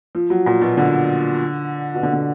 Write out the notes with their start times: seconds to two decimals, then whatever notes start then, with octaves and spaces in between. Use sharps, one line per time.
0.15 F3
0.30 F#3
0.46 A#2
0.61 B2
0.77 D3
1.94 B2
2.03 D3
2.13 D3